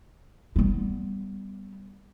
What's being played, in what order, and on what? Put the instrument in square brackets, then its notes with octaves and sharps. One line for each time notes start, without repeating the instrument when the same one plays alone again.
[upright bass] G3 B3